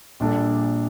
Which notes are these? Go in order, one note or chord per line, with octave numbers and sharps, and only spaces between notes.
A#1 A#2 G3 D4 A4